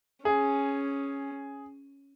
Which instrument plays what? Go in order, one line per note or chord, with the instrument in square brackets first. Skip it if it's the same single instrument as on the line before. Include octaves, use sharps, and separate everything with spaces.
[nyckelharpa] C#4 [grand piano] G#4